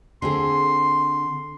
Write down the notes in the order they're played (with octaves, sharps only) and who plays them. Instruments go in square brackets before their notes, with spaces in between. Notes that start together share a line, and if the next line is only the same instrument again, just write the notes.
[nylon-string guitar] D3 C4 G#4 [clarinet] C6